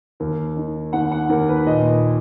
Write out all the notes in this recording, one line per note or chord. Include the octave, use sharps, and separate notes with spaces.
D#2 A#4
D#3
D#2 F#5
F#5
D#2 A#4
B4
A#2 D#5